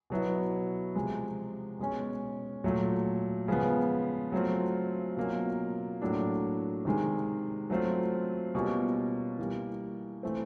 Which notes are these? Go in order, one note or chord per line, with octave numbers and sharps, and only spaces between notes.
B2 F#3 B3 E4
C3 F3 G#3
B2 G#3 C#4
A#2 F#3 A3
C#3 F3 G#3 B3
F#3 A3 C4 F4
B2 F#3 A#3 C#4 F4
A2 F#3 A#3 D4
C3 D#3 G#3
F#3 A3 C4 F4
B2 G3 A#3 C#4 F4
E3 G3 A#3
E3 A3 C4